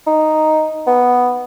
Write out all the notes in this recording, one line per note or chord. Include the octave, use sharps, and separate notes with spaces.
D#4
B3